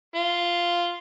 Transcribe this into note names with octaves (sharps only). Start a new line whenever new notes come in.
F4